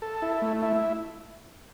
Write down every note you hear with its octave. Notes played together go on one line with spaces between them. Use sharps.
A4
E4
A3
E4